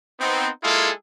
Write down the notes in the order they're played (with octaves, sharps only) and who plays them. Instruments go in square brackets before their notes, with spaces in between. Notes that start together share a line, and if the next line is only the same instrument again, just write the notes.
[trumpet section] B3 C4 D#4
G#3 A#3 E4 F4 G#4 A4